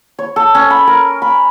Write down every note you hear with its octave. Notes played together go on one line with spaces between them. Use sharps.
C#5
A4
C#4
B5
A#4
B5